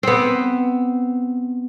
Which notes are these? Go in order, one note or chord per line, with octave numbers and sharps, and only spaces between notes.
B3 C4